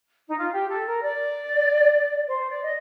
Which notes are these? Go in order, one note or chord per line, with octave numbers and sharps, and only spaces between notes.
D#4
F4
G4
A4
A#4
D5
C5
D5
D#5